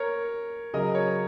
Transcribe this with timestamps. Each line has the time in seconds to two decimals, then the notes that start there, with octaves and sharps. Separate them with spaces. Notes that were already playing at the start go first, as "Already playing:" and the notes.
Already playing: A#4 C#5
0.74 C#3 F#3 A#4 D#5
0.95 C#5